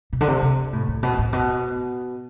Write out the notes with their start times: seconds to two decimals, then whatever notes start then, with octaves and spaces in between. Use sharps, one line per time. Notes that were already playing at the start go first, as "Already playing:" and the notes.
0.13 B2
0.21 D3
0.28 C3
0.42 C3
0.73 A2
0.88 A2
1.03 B2
1.19 A2
1.33 B2